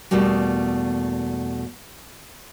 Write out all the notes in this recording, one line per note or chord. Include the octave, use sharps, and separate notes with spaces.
E2 B2 G3 A3 A#3